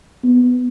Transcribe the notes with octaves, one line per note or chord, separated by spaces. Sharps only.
B3